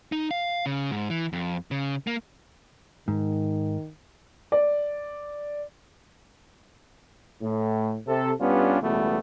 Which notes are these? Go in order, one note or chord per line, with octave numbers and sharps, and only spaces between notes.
D#4
F5
C#3
G#2
E3
F2
C#3
A#3
G#2 D#3
D5
A2
C3 A4
G2 G3 B3 C#4 D4 F4
C#2 B2 E3 G3 A3 B3